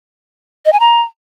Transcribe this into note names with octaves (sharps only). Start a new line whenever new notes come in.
D#5
G#5
A#5